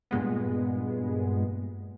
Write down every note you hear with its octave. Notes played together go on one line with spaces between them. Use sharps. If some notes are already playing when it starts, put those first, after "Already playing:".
G2 A#2 G#3 B3